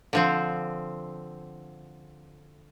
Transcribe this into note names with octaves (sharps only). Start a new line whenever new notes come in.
D3 F3 C4